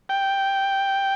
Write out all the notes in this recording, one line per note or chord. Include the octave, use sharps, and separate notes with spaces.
G5